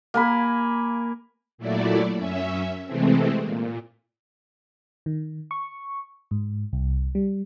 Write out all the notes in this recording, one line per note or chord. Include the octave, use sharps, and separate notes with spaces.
A#3 G#5 B5
A#2 F#3 A3 E4 D5
F#2 C#4 E5
C3 E3 G#3 A3 C4
A#2
D#3
C#6
G#2
C2
G3